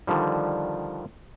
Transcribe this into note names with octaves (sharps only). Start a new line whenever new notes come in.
D3 D#3 F3 G3